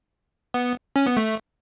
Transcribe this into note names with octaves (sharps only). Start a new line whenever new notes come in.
B3
C#4
B3
A3